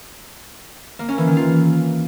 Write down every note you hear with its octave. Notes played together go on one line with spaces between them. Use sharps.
A#3
C#4
E3
D#3
F4